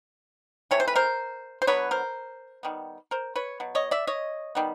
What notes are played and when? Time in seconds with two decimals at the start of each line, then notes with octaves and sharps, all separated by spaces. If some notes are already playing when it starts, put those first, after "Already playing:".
0.71 C3 E3 A3 C#5
0.80 C5
0.88 B4
0.96 A#4 C5
1.62 C5
1.67 D3 F#3 B3 B4 C#5
1.91 A#4 C5
2.63 D#3 G3 B3
3.11 A#4 C5
3.36 B4 C#5
3.60 B2 F#3
3.75 C#5 D#5
3.91 D5 E5
4.07 C#5 D#5
4.55 D#3 G3 B3